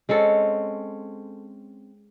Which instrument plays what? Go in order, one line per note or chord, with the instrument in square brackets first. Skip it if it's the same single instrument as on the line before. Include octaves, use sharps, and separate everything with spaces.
[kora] G#3 C4 C#4 A4